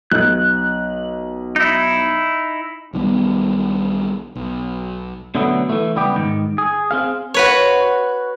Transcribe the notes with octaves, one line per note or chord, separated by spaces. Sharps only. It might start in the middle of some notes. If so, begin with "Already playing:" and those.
B1 F#6
D#4 E4
B1 D#3 G3 B3
B1
B2 D3 F#3 A3 B3
E3 A3
C#2 G3 B3 G4
G#2 D#3
G#4
C4 G#4 F5
F#4 B4 C#5